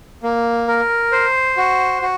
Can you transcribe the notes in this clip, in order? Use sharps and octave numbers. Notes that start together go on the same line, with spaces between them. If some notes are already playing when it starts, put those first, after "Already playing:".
A#3
A#4
C5
F#4
F#4